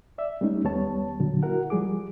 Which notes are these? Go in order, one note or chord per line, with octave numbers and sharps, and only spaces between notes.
D5 E5
G3 A3 C#4 D#4
D#2 G3 B3 C#5 A5
A#2 D3 F#3
E4 F#4 A#4 F#5
F3 G3 G#4 D6